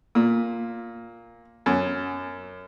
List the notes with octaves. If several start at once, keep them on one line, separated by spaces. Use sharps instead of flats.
A#2
F#2